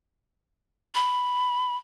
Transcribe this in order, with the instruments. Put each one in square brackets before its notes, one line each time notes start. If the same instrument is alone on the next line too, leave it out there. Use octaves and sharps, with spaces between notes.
[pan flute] B5